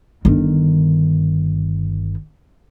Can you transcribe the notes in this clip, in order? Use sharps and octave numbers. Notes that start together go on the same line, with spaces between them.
G1 D#3